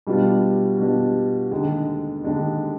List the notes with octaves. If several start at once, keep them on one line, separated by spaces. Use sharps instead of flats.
B2 G3 D4 F4
B2 G3 D4 F4
D#2 D3 G#3 D4
D#2 D3 G#3 D4